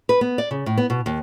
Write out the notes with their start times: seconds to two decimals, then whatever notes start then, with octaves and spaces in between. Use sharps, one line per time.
0.09 B4
0.21 B3
0.38 D5
0.51 C#3
0.66 A2
0.78 B3
0.90 B2
1.06 D#2